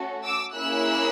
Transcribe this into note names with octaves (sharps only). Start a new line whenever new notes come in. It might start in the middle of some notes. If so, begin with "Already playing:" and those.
Already playing: A3 C#4 F#4 A4
D6 E6
A#3 C#4 E4 G#4 E6 F#6